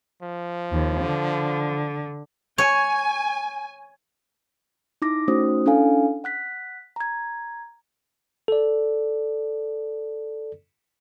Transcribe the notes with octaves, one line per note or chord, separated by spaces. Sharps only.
F3
D#2
D3
C#5 G#5
D#4 E4 D6 A#6
A3 C#4 D#4 F#4 C5 D#6
C#4 D4 E4 A4 F5 G#5
F#5 F#6 B6
A#5 G#6
A4 D5